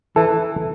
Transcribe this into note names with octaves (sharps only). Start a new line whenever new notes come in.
E3 A4